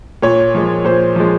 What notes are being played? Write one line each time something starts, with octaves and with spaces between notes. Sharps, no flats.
A#2 C#5
F3 G#3
A#2 C5
F3 G#3